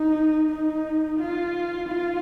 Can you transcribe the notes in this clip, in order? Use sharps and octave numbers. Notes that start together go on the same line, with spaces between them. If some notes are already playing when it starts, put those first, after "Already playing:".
Already playing: D#4
D#4
F4
F4